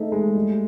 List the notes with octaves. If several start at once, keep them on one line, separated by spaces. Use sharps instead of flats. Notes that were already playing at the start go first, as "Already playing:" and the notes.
Already playing: A3 C4 D#4 G#4
G#3
G3